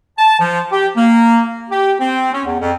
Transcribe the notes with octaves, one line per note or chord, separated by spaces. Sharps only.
A5
F3
G4
A#3
G4
C4
C#4
E2
F2